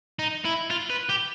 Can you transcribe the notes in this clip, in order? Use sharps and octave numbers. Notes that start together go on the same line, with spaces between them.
D#4
E4
F4
B4
G4